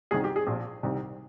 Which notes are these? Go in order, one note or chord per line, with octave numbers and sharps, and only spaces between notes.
C2 C3 D#3 G#4
G4
G#4
A#1 A#2 F3
C2 C3 D#3